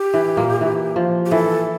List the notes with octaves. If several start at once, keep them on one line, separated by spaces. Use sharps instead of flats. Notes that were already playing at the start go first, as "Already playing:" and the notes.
Already playing: G4
E3
A#2 A#3
E3
F3
G4
E3 A4